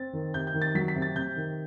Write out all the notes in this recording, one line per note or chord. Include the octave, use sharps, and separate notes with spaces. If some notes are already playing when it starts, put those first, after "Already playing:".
Already playing: C4 A6
D#3
C3 G6
G6
D#3
A6
F#3 B6
B6
C3
A6
C3 G6
D#3